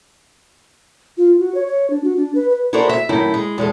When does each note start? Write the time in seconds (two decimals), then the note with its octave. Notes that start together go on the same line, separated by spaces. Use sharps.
1.17 F4
1.39 F#4
1.55 C#5
1.67 C#5
1.90 D4
2.04 F#4
2.17 D4
2.35 B4
2.50 B4
2.73 E4 F#4 A4 A#4 C5 D5
2.89 E5
3.09 F#2 A2 D#3 E4
3.34 G#3
3.58 E2 G#3 A4